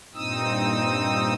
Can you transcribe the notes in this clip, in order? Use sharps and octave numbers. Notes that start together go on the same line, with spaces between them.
G2 A#2 C4 D#4 D#6 E6